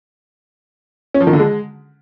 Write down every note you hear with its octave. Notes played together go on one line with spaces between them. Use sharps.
C#4
F3
D#3
D3
G#3